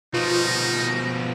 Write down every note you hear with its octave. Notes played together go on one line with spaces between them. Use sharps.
B2 F3 D#4 F4
A#6